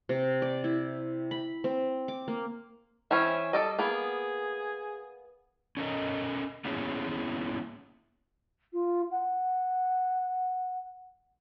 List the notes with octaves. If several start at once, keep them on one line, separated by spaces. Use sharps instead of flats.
C3
D5
E4
B5
C4
D6
A#3
E3 C4 C#4 E5
G3 A4 D5 D#5
A#3 B3 G#4
C#4 A4 A#4 D#5
A#3 B3 C#4 E4 G#4
F4
F#5